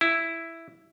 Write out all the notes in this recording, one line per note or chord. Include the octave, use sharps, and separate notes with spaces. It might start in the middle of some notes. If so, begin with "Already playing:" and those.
E4